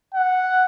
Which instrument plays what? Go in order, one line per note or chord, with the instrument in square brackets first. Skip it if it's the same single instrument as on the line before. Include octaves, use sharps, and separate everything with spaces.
[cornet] F#5